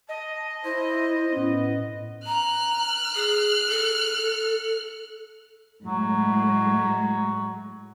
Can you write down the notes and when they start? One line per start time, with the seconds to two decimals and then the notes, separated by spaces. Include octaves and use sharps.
0.09 D#5 A5
0.65 E4 C5
1.32 A2 B3 C#4
2.26 A#5 F6 F#6
3.15 G#4
3.69 A4
5.85 A2 F#3 G#3